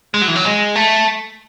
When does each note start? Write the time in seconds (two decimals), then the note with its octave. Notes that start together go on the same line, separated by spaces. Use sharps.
0.14 G#3
0.21 F#3
0.28 E3
0.36 F#3
0.45 G#3
0.76 A3